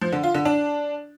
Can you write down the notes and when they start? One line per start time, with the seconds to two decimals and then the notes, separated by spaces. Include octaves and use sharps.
0.01 F3
0.12 D3
0.23 F4
0.34 D3
0.45 D4